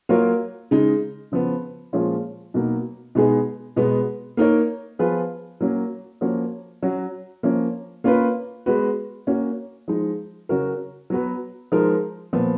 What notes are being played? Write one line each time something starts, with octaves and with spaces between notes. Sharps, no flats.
F#3 A#3 F4 A#4 C#5
C#3 G#3 D#4
C#3 F3 B3
A#2 F3 G#3 C#4 F4
B2 F#3 A#3 D#4
B2 G#3 B3 D#4 G#4
B2 G#3 B3
A#3 D#4 A#4 C#5
F3 B3 F4 G#4 B4
F#3 A#3 C#4
F3 A#3 C#4 F#4 C#5
F#3 C#4 F#4
F3 A#3 C#4
A#3 C#4 F4 B4
G#3 B3 F#4 B4
A#3 C#4 F#4
F3 G#3 D#4
C#3 F#3 C#4 F#4 A#4
F#3 B3 F#4 B4
F3 G#3 D#4 A#4
A#2 F3 B3